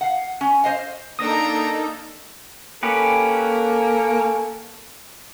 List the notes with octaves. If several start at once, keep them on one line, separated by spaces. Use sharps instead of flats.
F5 F#5
C#4
C5 D#5 F5
A#3 D4 D#4 A4 A#5 D#6 A#6
A#3 C#4 G4 A4 B4